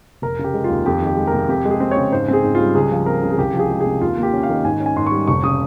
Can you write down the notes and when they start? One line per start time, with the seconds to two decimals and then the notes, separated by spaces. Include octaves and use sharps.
0.22 F1 A#4
0.39 C#3
0.44 G4
0.54 G#3
0.64 F4
0.70 D#2
0.86 F2 G4
1.02 D#3 G4
1.17 G#3
1.27 A#4
1.33 C3
1.49 F2 G4
1.65 G#3
1.71 G#4
1.80 C4
1.91 C#5
1.97 C#3
2.12 G#2 C5
2.28 C4 G#4
2.43 G#2
2.55 F4
2.60 G3
2.75 C#2 G#4
2.92 F3
3.06 C4 A#4
3.23 C#3
3.31 G#4
3.38 C2 G4
3.54 F3
3.59 G#4
3.71 G#3
3.81 G#4
3.86 C3
4.01 D#2 F4
4.18 A#3
4.23 G4
4.33 C#4
4.43 F5
4.50 D#3
4.64 G#2 G#5
4.80 C#4
4.86 G#5
4.96 G#2 C6
5.06 C#6
5.12 G3
5.27 F1 C#6
5.43 C#3 D#6